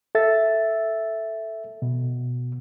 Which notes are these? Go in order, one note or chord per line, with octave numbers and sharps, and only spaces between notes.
A4 E5 A6
B2